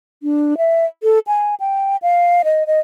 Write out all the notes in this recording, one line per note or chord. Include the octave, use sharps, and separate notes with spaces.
D4
E5
A4
G#5
G5
F5
D#5
D#5